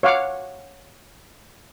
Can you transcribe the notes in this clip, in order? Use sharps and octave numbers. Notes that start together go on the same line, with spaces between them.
C#5 F5 F#5 D6